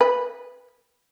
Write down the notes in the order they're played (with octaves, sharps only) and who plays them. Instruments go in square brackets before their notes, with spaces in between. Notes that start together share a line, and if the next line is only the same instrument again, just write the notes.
[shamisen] B4